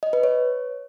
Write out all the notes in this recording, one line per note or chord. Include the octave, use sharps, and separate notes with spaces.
D#5
B4
C#5